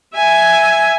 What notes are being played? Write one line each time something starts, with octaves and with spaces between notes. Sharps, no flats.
E5 G#5